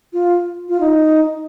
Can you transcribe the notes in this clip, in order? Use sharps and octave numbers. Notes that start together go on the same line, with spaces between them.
F4
F4
D#4